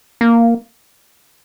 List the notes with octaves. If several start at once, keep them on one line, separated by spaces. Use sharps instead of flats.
A#3